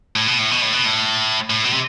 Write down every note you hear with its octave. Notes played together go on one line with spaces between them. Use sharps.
A2
B2
A2
B2
A2
B2
A2
A2
B2
C3